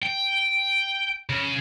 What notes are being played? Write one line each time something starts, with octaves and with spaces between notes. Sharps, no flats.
G5
C#3